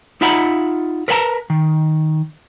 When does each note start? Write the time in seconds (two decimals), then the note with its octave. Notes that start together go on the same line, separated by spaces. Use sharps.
0.21 D#4 F4 E5 F#5 A#5 B5
1.08 A#4 B4 C#5 F#5 A5 A#5
1.50 D#3